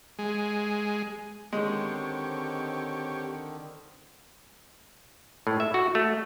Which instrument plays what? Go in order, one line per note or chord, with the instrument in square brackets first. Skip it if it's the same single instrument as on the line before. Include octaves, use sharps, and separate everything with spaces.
[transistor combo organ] G#3
[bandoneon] D3 D#3 [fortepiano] G#3 [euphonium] C4 [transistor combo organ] G4 C#5
[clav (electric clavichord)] A2
E5
F#4
A3